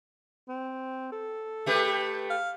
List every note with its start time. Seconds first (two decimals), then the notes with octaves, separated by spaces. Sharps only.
0.48 C4
1.12 A4
1.66 A3 G4 B4
2.30 F5